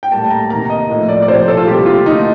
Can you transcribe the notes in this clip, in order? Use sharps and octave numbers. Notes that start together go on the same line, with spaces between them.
G5
A2 G3 A#3 A5
A#5
C3 D#3 A#3 A#5
D#5
A2 F3 A#3
D5
D5
C3 F3 A3 C5
A4
F4
C3 G3 A#3 G4
F4
D3 A3 D#4